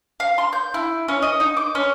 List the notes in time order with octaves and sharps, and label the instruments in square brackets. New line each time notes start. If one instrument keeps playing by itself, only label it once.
[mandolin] F5
C6
G6
E4
C#4
D#5
D#4
D6
C#4